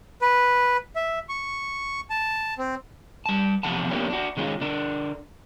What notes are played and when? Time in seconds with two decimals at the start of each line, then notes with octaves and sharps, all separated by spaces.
0.22 B4
0.96 E5
1.29 C#6
2.10 A5
2.58 C4
3.26 G3 A5
3.63 E2 C3 F3 A3 F#5 A5
3.90 F3 A#3 B3 C#4 D4 G4
4.10 D4 F#4
4.37 D#3 G#3 C#4 E4 F4
4.61 D3 D4 A#4